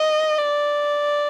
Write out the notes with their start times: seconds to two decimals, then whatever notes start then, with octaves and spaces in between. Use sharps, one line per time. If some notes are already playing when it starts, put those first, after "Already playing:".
Already playing: D#5
0.38 D5